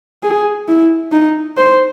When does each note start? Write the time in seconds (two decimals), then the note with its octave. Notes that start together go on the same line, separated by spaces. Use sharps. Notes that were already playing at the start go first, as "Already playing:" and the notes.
0.23 G#4
0.68 E4
1.12 D#4
1.57 C5